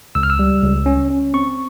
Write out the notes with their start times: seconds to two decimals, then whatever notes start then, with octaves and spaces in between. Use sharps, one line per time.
0.15 C#2 E6
0.23 F6
0.30 E6
0.39 G3
0.63 C#2
0.86 C#4
1.10 C#4
1.34 C4 C#6